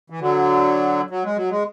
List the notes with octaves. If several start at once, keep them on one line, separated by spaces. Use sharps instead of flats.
E3
D3 F#3
F#3
G#3
F#3
G#3